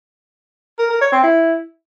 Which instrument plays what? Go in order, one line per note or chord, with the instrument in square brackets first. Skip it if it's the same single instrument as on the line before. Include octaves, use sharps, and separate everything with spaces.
[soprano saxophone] A#4
A#4
C#5
C4
E4